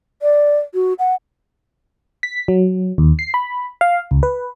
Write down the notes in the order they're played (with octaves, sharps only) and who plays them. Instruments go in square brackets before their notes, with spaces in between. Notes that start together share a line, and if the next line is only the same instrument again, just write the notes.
[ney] D5
F#4
F#5
[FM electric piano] B6
F#3
D#2
C7
B5
F5
C#2
B4